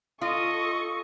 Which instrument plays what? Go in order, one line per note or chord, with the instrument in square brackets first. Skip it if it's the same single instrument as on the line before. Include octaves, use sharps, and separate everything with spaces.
[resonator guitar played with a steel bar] F4 [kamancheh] A4 C#6 [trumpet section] D#5 D#6